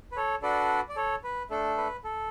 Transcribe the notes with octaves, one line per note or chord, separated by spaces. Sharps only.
B4
A4 C#5
D4 F#4 A4 B4 D5
D5
A4 C#5
B4
A3 D4 A4
B4
A4